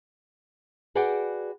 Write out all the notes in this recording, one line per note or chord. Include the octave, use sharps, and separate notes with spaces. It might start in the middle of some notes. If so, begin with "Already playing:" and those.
F#4 G#4 B4 D5 F#5 G5